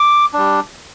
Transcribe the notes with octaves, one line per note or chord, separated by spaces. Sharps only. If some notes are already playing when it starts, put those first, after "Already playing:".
Already playing: D6
G3 D4